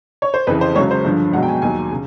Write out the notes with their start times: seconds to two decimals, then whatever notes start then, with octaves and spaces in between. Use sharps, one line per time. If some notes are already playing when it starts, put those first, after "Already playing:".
0.22 C#5
0.34 C5
0.47 F2 C#3 E3 B4
0.61 C5
0.75 C#2 C#3 F#3 C#5
0.91 C5
1.05 G2 D3 F3
1.33 C#2 B2 F#3 F#5
1.43 G5
1.48 G#5
1.56 G5
1.62 D#2 D#3 F#3 G#5
1.92 C#3